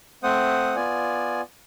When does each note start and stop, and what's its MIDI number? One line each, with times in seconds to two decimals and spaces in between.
0.23 0.76 57
0.23 0.76 60
0.23 0.76 72
0.23 0.76 78
0.23 0.76 87
0.76 1.41 59
0.76 1.41 65
0.76 1.41 74
0.76 1.41 80